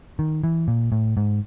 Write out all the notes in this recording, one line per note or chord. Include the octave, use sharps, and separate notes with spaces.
D#3
E3
A#2
A2
G#2